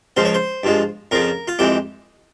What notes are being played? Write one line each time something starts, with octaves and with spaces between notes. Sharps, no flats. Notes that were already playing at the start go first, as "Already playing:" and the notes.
C#2 C#3 F3 G#3 C5
C#5
C5
G2 F3 G#3
F2 C#3 F3 A#4
F4
F2 E3 G#3 G4